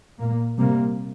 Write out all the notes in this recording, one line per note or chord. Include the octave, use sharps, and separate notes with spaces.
A#2 A#3
C3 G3 A#3